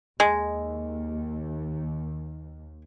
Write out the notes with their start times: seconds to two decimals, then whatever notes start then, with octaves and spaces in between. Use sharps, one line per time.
0.20 D#2 G#3